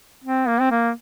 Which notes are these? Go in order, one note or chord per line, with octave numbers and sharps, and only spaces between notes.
C4
A#3
C4
A#3